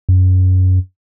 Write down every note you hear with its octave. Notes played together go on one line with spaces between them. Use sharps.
F#2